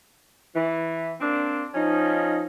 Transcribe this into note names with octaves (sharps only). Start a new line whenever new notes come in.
E3
A#3 C4 D4
F3 C#4 D#4